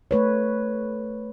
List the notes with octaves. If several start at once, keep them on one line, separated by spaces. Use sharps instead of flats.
A3 B4 C#5